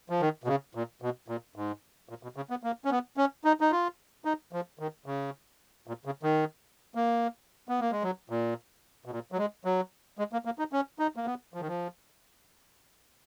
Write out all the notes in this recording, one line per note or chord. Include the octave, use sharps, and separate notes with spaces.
F3
D#3
B2
C#3
A#2
B2
A#2
G#2
A#2
B2
C#3
B3
A#3
C#4
B3
C#4
D#4
D#4
F4
D#4
F3
D#3
C#3
A#2
C#3
D#3
A#3
B3
A#3
G#3
F#3
A#2
B2
A#2
F#3
G#3
F#3
G#3
A#3
A#3
D#4
C#4
D#4
A#3
B3
F3
D#3
F3